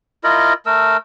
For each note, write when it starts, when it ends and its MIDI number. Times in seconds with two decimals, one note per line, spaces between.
0.24 0.53 64
0.24 0.53 65
0.24 0.53 70
0.24 0.53 75
0.66 0.97 57
0.66 0.97 70
0.66 0.97 88